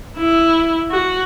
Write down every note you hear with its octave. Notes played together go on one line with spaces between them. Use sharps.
E4
F#4